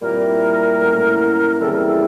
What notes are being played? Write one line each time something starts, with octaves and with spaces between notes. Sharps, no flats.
A#2 G3 C4 E4 A#4
A2 F#3 A#3 C#4
C#3 E3 G3 C4 A4
A#4
A4